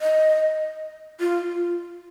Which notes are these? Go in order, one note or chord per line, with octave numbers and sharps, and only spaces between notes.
D#5
F4